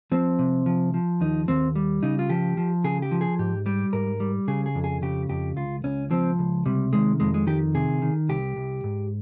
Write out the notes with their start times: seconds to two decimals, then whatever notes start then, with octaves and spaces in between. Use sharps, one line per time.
0.12 F3 C4
0.39 C3
0.66 F3
0.94 F3
1.21 D#2 D#4
1.48 D#2 C4
1.76 G3
2.03 C#3 D#4
2.19 F4
2.30 F3 G4
2.57 F3
2.84 C#3 G#4
3.02 G4
3.11 F3
3.21 G#4
3.39 G#2 G4
3.66 G3 G4
3.93 G#2 A#4
4.20 G3
4.48 C#3 G#4
4.66 G#4
4.75 F2
4.84 G#4
5.02 C#3 G4
5.29 F2 G4
5.56 C#2 F4
5.84 C#2 C#4
6.11 F3 C4
6.39 C#2
6.66 C3 G3
6.93 D#3 G#3
7.20 F2 G#3
7.34 G#3
7.47 D#3 G4
7.75 C3 G#4
8.02 D#3
8.29 C2 G4
8.57 C2
8.84 G#2